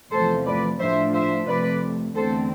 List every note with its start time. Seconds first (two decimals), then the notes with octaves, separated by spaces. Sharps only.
0.11 E2 C3 F3 A3 A4 C5
0.45 B4 D5
0.79 A2 F3 A3 D4 F4 C5 E5
1.13 C5 E5
1.47 F2 C3 F3 A3 B4 D5
2.16 E2 D3 A3 C4 A4 C5